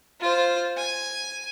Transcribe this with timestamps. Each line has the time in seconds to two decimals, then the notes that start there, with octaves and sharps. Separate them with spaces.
0.20 F4 C5
0.77 G#5